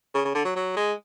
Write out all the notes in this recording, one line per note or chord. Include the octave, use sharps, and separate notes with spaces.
C#3
C#3
D3
F#3
F#3
G#3